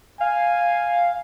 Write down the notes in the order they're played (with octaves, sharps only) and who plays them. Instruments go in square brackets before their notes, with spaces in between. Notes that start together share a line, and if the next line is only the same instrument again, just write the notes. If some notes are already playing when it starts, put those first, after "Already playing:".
[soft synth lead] F5 [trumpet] G#5